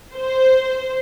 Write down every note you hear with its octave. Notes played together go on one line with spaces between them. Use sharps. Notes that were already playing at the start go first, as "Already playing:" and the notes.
C5